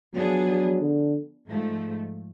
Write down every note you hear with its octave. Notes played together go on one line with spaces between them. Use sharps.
F3 F#3 B3 D4 G#4
D3
G#2 F3 A3